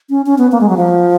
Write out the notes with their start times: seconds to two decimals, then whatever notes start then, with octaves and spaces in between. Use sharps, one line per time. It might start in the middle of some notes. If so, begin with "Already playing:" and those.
0.10 C#4
0.26 C#4
0.38 B3
0.52 A#3
0.61 G#3
0.69 F#3
0.77 F3